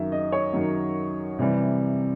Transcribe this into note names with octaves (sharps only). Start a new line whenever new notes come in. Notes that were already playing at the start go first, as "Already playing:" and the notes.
Already playing: F#2 D#3 F#3 E5
D#5
C#5
F#2 D#3 F#3
C3 E3 G3